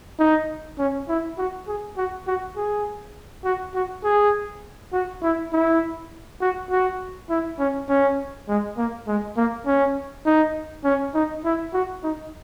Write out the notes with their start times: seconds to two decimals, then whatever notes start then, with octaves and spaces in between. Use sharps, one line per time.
0.19 D#4
0.78 C#4
1.09 E4
1.38 F#4
1.67 G#4
1.97 F#4
2.27 F#4
2.56 G#4
3.44 F#4
3.75 F#4
4.04 G#4
4.93 F#4
5.23 E4
5.53 E4
6.41 F#4
6.71 F#4
7.30 E4
7.59 C#4
7.89 C#4
8.48 G#3
8.77 A#3
9.07 G#3
9.37 A#3
9.66 C#4
10.25 D#4
10.84 C#4
11.14 D#4
11.44 E4
11.73 F#4
12.03 D#4